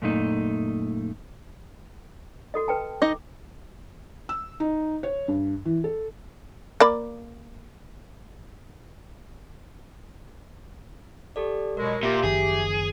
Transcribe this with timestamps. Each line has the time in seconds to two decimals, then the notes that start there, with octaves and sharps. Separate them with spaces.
0.02 F#2 A#2 A3 D#4
2.54 F#4 A4 D#5
2.68 B4 G5 A5
3.02 D#4 D#5 D6
4.29 E6
4.60 D#4
5.03 C#5
5.28 G2
5.65 E3
5.84 A4
6.80 A#3 D5 B5
11.36 G4 A4 D5
11.77 B2 F#3 G#3 A#4
12.03 A#2 G4 E5
12.23 F#1 D#3 F3 G#4